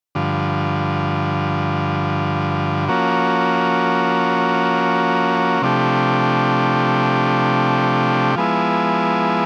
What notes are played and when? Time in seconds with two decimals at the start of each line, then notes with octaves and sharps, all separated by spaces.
0.15 G2 D3 F3
2.88 F3 A#3 C#4 F#4
5.62 C3 F3 A3 D4 G4
8.35 F3 G#3 B3 E4